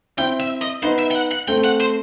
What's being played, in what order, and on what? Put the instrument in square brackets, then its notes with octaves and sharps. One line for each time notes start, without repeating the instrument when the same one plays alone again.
[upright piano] C4 E4 [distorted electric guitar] G5
[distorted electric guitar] E5
D#5
[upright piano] B3 D#4 [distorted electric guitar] C5
[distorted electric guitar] E5
G5
F#5
F#5
[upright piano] A3 C4 [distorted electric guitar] G5
[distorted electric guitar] F#5
C5